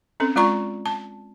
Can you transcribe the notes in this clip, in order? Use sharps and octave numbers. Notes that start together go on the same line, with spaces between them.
C4 C#4 A4
G#3 F4 D5 A#5 C#6
A5